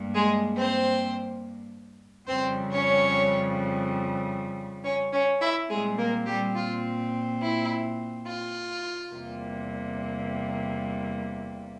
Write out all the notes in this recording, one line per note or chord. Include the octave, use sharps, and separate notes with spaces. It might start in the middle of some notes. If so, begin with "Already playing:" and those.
Already playing: G2 A#3
G#3 G#4
C4 C5
F2 C#3 G3 C4 C5
C#4 C#5
C#4 C#5
C#4 C#5
E4 E5
A#2 G3 G#3 C4 G#4
A#3 A#4
G3 G4
F4
E4
F4
E2 C3 G3 A#3